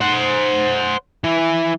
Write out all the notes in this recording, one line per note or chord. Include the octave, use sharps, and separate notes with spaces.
C5 F#5
E3